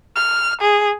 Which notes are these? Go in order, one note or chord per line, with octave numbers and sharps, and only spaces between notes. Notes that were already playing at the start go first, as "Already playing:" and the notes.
F6
G#4